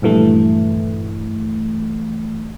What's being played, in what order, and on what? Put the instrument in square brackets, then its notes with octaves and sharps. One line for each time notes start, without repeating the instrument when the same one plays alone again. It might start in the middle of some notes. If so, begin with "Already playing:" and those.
[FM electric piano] A#1 G2 E3 A3